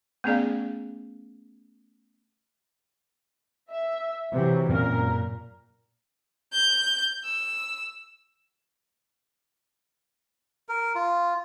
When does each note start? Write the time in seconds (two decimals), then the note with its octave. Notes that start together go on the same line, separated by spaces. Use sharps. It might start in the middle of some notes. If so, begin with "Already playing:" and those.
0.24 A3 B3 C#4 G#4 D5 F5
3.70 E5
4.33 C3 E3 F#3
4.69 F#2 A#2 C4 C#4 A#4
6.52 G6
7.24 E6
10.69 A#4
10.95 F4